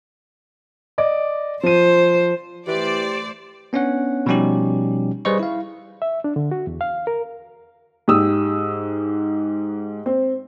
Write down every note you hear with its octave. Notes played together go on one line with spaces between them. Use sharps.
D5 D#5 D6
F3 C5 D#7
E3 A3 G4 C5 D5
B3 C#4 D4 C#5 F#5
B2 F3 G3 C#4 D#4 G4
G3 G#4 B4 C5 D#5 C#6
E4 F5
E5
D4
D3
F#4
E2
F5
A#4
G#2 G4 D#6 E6
C4